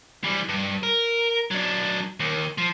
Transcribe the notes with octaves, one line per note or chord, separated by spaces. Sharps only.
E3 G3
G2
A#4
F#3 D4
D#2
F3